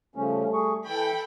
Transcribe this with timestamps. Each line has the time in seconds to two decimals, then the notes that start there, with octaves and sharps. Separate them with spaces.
0.16 C#3 F3 G3 A3 C#4
0.53 G#4 C#6
0.86 E3 A4 G5 B5